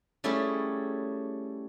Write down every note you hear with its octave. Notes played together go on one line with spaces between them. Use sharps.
G3 A3 C#4 E4 G4 G#4